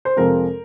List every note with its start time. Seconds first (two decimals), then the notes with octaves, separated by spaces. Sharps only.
0.05 C5
0.17 F2 C3 F3 G#3 C4 A#4